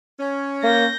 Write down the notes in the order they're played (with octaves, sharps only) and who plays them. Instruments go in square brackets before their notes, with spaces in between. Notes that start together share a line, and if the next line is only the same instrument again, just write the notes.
[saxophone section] C#4
[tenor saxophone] A#3 [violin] G6 A#6